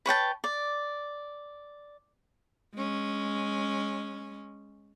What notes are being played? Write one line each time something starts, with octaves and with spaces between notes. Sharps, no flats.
B4 C#5 G5 A5
D5
G#3 C#4